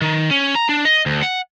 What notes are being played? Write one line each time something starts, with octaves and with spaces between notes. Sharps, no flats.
D#3
C#4
A#5
D4
D#5
D2
F#5